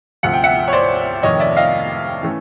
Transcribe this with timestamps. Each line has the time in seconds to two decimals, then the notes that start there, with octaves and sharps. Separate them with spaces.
0.23 D2 C3 F3 F#5
0.33 G5
0.44 E5 F#5
0.68 C#5
0.73 C5 D5
1.23 F1 F2 C3 D#3 C#5 D#5
1.40 D5 E5
1.57 D#5 F5
2.23 E3 A3 C#4